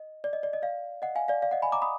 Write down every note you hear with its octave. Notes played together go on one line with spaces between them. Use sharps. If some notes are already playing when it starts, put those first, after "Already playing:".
Already playing: D#5
D5
D#5
D5
D#5
D5 F5
D#5 F#5
F5 G#5
D5 F5
D5 F5
D#5 F#5
G#5 B5
A#5 D6
B5 D#6